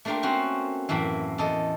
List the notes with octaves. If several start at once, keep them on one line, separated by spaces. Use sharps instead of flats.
A3 A#3 D4 F4 G4 A#4
C4 C#4 F#4 C5
F#2 A2 E3 A#3 E5
E2 A4 D#5